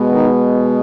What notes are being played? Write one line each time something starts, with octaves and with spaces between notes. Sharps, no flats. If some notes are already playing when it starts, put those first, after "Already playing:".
Already playing: B2 G#3 B3
D#3 D#4